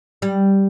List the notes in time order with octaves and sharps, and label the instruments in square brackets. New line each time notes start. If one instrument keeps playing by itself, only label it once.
[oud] G3